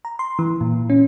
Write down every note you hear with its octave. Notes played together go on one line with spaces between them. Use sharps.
A#5
C6
E3
A#2
C#4